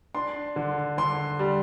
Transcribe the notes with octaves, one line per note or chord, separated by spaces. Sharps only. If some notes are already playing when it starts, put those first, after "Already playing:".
D4 C6
D3
D3 C6
G3